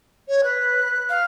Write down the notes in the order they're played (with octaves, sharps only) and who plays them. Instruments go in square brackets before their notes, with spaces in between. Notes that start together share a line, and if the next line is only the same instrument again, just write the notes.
[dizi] C#5
[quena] B4 [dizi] F#6
[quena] F5